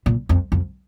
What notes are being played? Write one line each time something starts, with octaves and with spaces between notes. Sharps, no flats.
A#2
F2
F2